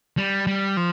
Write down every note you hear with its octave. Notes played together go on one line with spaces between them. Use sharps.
G3
G3
F3